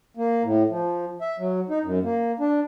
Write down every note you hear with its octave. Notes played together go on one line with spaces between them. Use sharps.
A#3
A2
F3
E5
F#3
D#4
F#2
A#3
D4